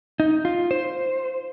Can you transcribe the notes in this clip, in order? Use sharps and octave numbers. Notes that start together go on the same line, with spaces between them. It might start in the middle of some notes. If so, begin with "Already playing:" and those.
D#4
F4
C5